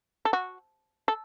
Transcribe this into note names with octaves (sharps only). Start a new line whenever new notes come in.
A4
F#4
A4